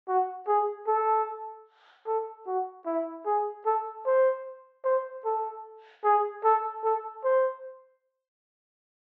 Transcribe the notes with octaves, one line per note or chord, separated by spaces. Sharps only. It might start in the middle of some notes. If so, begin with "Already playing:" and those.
F#4
G#4
A4
A4
F#4
E4
G#4
A4
C5
C5
A4
G#4
A4
A4
C5